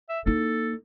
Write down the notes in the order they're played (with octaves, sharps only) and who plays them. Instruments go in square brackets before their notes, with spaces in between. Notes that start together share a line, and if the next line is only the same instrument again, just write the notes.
[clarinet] E5
[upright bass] A#3 D#4 [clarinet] A4